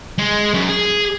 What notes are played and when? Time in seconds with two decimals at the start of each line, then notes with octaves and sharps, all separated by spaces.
0.19 G#3
0.54 F#2
0.69 G#4